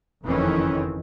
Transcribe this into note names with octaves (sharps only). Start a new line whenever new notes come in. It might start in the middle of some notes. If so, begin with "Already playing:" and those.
F#1 F2 D#3 E3 C4 C#4